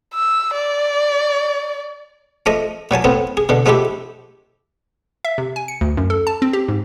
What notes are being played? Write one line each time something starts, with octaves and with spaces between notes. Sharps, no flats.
E6
D5
F3 A3 D#5 D#6
A#2 F#3 G#5 A5
A2 B3 C4
G#4
B2 D3
F3 G#3 A3 E4 G4
E5
C3
G#5
C#7
D2
F#2
A4
A5
C4
G4
G#2